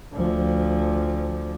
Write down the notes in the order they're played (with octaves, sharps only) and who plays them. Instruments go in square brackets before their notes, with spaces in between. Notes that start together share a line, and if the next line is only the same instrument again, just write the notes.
[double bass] D2 F3